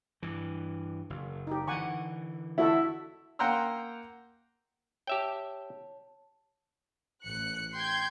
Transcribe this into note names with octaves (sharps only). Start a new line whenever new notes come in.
G2 E3
F#1
D#4 G4
D3 E3 F#5 G#5 C#6
E4 F#4 A4 E5
A#3 F#5 G5 A#5 C6 E6
G4 C#5 E5 G5 A5
A1 F#6 C#7
G5 C6 G6 G#6